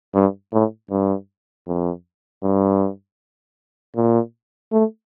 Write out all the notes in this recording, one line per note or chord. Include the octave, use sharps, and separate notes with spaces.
G2
A2
G2
F2
G2
A#2
A3